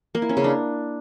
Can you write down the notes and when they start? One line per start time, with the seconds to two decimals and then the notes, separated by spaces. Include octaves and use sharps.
0.15 A#3
0.22 E4
0.29 C#4
0.37 C#3
0.44 D4